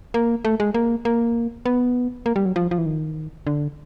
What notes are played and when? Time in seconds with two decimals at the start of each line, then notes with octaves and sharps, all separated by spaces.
0.14 A#3
0.45 A3
0.60 G#3
0.74 A#3
1.05 A#3
1.66 B3
2.26 A#3
2.36 G3
2.45 F#3
2.56 F3
2.71 F3
2.78 E3
2.86 D#3
3.47 D3